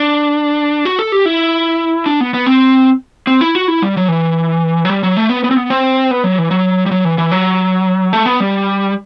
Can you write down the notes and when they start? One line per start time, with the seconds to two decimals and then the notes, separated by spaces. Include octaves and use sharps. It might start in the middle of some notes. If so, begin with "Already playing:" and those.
Already playing: D4
0.85 F#4
0.99 A4
1.12 G4
1.26 E4
2.06 D4
2.21 B3
2.34 B3
2.46 C4
3.27 C4
3.41 E4
3.55 F#4
3.68 E4
3.82 G3
3.97 F#3
4.08 E3
4.85 F#3
4.90 G3
5.03 F#3
5.17 A3
5.30 B3
5.44 B3
5.51 C4
5.56 B3
5.70 C4
6.11 B3
6.24 F#3
6.38 E3
6.51 F#3
6.86 G3
6.91 F#3
7.05 E3
7.18 E3
7.31 F#3
8.13 A3
8.26 B3
8.40 G3